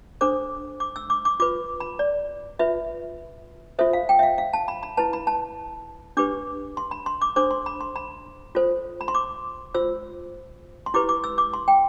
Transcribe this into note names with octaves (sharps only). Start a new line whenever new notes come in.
D4 A4 C5 D6
D6
E6
D6
D6
F4 B4 D6
B5
D5
F4 B4 E5
F4 A4 C5 E5
F5
G5
E5
F5
F5
A5
B5
B5
E4 B4 A5
B5
A5
D4 G4 B4 D6
C6
B5
C6
D6
D4 A4 C5 D6
C6
B5
C6
B5
F4 A4 C5
B5
C6
D6
F4 C5 E6
C6
E4 G4 B4 D6
D6
E6
D6
C6
G5